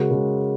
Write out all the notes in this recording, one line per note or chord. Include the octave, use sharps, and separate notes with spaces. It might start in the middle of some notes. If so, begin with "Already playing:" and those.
Already playing: C#3 G#3 F#4 A#4
C#3 G#3